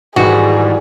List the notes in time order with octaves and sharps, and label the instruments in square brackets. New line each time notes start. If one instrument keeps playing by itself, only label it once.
[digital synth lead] G#2 [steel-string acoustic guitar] D#3 E3 G3 [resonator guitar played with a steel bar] F#4 [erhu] G#4